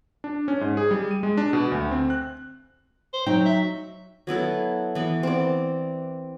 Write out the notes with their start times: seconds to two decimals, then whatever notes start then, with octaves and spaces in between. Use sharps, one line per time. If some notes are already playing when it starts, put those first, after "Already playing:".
0.24 D4
0.48 C#4
0.61 G#2
0.77 G#4
0.91 G3
1.11 D#7
1.23 G#3
1.37 D4
1.53 B2
1.72 D2
1.91 C4
2.10 F#6
3.14 C5
3.26 F#3 D#4 G5
3.46 E5
4.27 F#3 B3 E4 A4
4.95 E3 B3
5.23 C4 D5